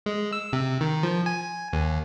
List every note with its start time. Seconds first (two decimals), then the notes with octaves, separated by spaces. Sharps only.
0.06 G#3
0.33 E6
0.53 C3
0.81 D#3
1.03 F3
1.26 G#5
1.73 D#2